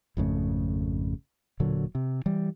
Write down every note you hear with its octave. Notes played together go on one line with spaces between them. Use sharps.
G#1 F2 C#3 A3
E1 A#2 D3 F#3
C3
E3 G3